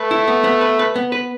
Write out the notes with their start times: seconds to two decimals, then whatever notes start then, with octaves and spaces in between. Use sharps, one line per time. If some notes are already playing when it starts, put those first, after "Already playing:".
Already playing: A3 B4
0.11 E4
0.27 B3
0.44 B3
0.61 B4
0.79 B4
0.96 B3
1.12 B4